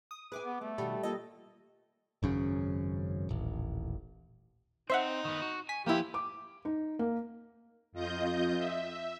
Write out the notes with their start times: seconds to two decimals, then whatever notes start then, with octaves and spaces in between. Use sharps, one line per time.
0.11 D#6
0.32 G#4 B4 E5 G#5 D6
0.45 B3
0.61 G3 A3 B3
0.78 B2 D#3 G3 F#4 A4
1.03 E3 A#3 F4 A4 D#5
2.23 G#1 F#2 C#3
3.29 D#1 A1
4.90 C4 D#4 C5 E5 F#5
5.25 D#3 B3
5.42 F#4
5.69 G#5 B6
5.86 F3 A#3 B3 E4 G4
6.14 D6
6.65 D#4
6.99 A#3
7.92 F2 F3 D#5 G6
8.58 E5